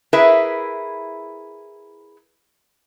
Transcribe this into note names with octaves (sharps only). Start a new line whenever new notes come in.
E4 G#4 A#4 B4 E5